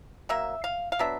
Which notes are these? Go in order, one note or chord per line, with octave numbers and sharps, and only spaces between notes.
F#3 A#3 E5
F5
F5
F#3 B3 D4 E5